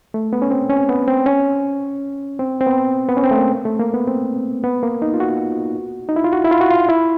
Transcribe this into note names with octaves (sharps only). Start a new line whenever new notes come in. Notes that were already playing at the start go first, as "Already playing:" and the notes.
A3
B3
C#4
C4
C#4
B3
C4
C#4
C4
C4
B3
B3
C#4
C4
A3
A#3
A3
A#3
B3
C4
B3
A#3
D#4
F4
F#4
D#4
E4
F4
F#4
E4
F4
F#4
F4
E4